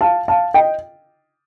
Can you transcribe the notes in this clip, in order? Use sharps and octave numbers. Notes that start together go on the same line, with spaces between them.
F5 A5
F5 A5
D#5 G5